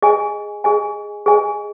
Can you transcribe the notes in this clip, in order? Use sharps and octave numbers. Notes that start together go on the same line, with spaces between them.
G#4 D#5 G#5
G#4 D#5 G#5
G#4 D#5 G#5